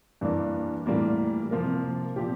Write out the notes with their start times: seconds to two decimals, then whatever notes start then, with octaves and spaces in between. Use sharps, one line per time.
0.21 G2 E3 A#3 D4
0.86 A2 E3 G3 A#3 F4
1.51 C3 F3 A#3 F4 A#4
2.16 A#2 F3 C4 G4